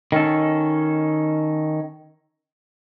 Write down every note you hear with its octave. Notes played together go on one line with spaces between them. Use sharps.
D#3 C#4 A4